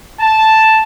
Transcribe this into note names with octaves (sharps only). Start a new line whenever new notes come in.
A5